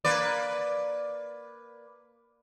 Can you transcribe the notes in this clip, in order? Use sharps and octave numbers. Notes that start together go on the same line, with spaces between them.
A#3 B4 D5